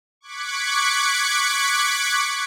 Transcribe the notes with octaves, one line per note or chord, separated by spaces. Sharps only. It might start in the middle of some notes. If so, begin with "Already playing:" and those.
C#6 D6 F#6 G#6 B6 C#7